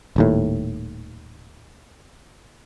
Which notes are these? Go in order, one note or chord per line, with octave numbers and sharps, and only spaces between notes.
D#1 D#2 A2